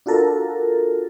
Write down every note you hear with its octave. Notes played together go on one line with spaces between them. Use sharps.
D4 F4 F#4 A4 A#4